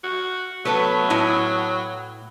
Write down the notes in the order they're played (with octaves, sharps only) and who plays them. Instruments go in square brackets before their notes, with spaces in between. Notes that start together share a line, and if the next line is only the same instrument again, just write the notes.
[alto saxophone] F#4
[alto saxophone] F#3 [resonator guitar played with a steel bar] A3 B3 B4
[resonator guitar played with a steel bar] A2 E4 G#5